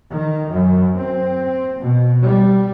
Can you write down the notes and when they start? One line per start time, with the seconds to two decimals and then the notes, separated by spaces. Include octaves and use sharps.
0.12 D#3
0.50 F#2
0.95 C4
1.79 B2
2.25 G3